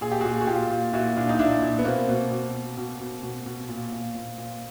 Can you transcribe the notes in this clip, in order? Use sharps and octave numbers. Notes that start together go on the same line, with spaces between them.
A#2 G#4
G4
A#2 F#4 G#4
F#4
A#2 F4 G4
A#2
A#2 E4 F#4
A#2 D4
D#4
A#2 D4 E4
A#2
B3
B2 A#3 C4
B2
B2
B2
B2
B2
B2
B2
A#2
A#2
A#2
A#2